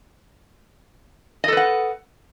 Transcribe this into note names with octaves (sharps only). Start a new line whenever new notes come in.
A4 B4 D#5 F#5